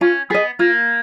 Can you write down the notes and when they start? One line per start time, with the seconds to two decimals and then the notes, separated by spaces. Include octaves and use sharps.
0.01 C#4 F4
0.30 B3 G#4 D#5
0.59 A#3 F4